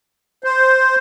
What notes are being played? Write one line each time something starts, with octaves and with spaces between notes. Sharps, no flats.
C5